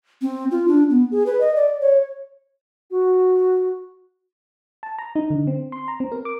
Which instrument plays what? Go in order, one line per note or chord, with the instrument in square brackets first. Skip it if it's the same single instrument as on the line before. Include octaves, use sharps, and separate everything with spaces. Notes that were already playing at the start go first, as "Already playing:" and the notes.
[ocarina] C4
F4
D4
B3
G#4
B4
D#5
D5
C#5
[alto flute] F#4
[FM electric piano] A5
A#5
D#4
D3
C4
C6
A#5
C4
A#4
D6